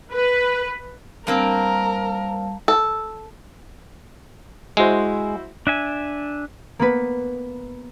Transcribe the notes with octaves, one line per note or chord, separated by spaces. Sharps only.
B4
G2 G3 A#3 C4 A#4 F5 A5
A4
G#3 E4 F#4 C5
D4 E5 G#5
A#3 B3 B4